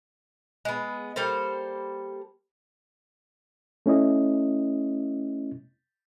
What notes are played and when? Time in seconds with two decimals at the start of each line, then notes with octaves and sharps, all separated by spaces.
0.65 G#3 B3
1.16 G3 A#3 A4 C5
3.86 A3 C#4 E4 D#5